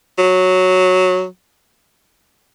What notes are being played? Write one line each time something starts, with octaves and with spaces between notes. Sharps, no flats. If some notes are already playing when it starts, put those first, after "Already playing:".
F#3